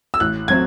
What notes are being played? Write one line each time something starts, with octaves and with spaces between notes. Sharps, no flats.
E6
A1 F#6
F#3 C4 G#6